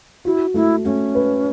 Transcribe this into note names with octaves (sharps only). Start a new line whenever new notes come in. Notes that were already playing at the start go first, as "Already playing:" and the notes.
E4 F#4
A3 E4
A3 C#4
B4